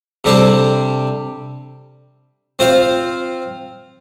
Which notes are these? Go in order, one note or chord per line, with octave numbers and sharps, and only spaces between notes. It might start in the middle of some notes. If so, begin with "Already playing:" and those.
C3 G3 D4 A4 C5
C4 F4 C5 F5